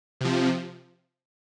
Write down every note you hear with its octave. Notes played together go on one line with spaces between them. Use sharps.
C3 F3